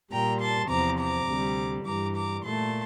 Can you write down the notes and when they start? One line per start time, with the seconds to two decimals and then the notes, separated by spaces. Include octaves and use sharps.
0.11 A#2 G3 G5 A#5
0.40 A5 C6
0.69 E2 C3 F3 A#5 D6
0.98 A#5 D6
1.28 D2 C3 G3
1.85 G2 E3 G3 A#5 D6
2.15 A#5 D6
2.44 A#2 A3 A5 C6